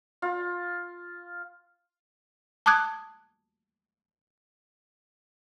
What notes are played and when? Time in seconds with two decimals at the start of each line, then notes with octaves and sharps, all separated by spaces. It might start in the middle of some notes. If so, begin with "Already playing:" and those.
0.22 F4
2.66 A5 D6 D#6 F#6 G#6